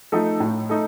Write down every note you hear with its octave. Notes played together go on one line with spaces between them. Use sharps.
F3 A3 D#4 A4
A2
A3 D#4 A4